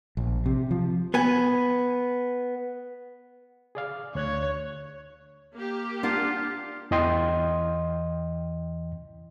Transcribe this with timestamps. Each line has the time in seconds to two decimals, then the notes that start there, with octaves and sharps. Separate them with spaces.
0.17 A#1
0.46 C3
0.71 F3
1.14 B3 G#5
3.75 G#4 D5 F5
4.15 D2 C#5 F#6 G#6
5.54 A#3 G4
6.03 D4 F4 A#4 F#5
6.91 E2 E3 D#5 G5 C6